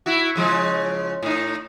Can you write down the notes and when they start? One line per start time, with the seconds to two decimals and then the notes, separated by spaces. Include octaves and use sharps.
0.06 E4 F#4
0.36 C#3 F3 G#3
1.23 A2 D#4